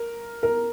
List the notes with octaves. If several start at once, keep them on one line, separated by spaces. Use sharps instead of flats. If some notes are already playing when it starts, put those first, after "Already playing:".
Already playing: A#4
A#4